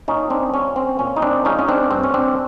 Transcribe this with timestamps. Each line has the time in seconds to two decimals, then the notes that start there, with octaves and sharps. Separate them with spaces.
0.08 A#2 C#4 D#4
0.30 C4 D4
0.53 F3 G#3 C4 C#4
0.76 C4
0.99 A#2 C#4
1.16 D#4
1.22 C4 D4
1.45 F3 G#3 C4 C#4 D#4
1.59 C#4
1.69 C4 D4
1.91 G2 C4
2.04 C#4
2.14 C4 D4